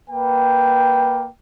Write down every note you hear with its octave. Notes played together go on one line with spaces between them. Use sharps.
A#3 B4 G5